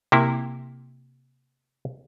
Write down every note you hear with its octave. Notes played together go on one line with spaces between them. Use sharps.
C3 A#3 E4